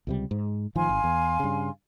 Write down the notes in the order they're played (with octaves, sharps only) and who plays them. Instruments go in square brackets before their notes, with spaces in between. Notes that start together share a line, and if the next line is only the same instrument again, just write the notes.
[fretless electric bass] C#2 C3 G3
G#2
[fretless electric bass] A1 D#3 F3 [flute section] F5 G#5 C6
[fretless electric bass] G#1
E2
G2 C#3